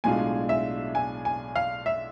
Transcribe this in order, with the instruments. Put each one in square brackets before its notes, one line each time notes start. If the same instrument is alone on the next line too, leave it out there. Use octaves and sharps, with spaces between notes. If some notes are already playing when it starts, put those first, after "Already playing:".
[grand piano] B1 A2 G#3 D4 F4 [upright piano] G#5
[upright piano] E5
G#5
G#5
F5
E5